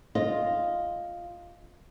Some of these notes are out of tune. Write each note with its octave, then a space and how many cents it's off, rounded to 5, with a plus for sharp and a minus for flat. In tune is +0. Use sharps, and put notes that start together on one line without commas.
F4 +0 D#5 +0